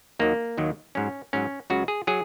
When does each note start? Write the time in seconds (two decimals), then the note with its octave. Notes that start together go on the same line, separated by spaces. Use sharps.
0.19 D#2 D#3 F#3 A#3
0.58 D#2 D#3 F#3
0.95 G#2 F#3 C#4
1.33 G#2 F#3 C#4
1.70 C#2 C#3 F#3 F#4
1.88 G#4
2.07 F#3 G#4